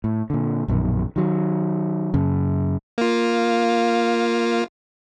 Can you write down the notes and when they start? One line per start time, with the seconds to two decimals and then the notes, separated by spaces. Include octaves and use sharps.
0.04 A2
0.30 A#2 D3
0.68 A#1 F#2 B2 D#3
1.16 D#3 F#3
2.14 F#2 C#3
2.98 A#3 F4